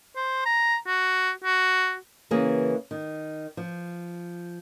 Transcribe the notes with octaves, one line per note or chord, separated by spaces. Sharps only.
C5
A#5
F#4
F#4
C#3 E3 A#3 G#4
D#3
F3